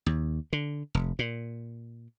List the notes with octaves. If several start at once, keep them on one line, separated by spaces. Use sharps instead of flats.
D#2
D3
F1
A#2